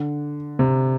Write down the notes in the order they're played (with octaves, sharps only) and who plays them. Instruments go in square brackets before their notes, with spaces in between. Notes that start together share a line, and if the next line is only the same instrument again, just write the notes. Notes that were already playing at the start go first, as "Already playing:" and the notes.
Already playing: [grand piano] D3
C3